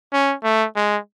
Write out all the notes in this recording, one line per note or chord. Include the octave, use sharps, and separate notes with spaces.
C#4
A3
G#3